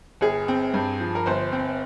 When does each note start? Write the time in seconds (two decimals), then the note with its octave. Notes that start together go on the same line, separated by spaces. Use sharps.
0.21 G1 G#4
0.48 C4
0.74 G2
1.00 F3
1.15 A#4
1.26 G1 C5
1.52 C4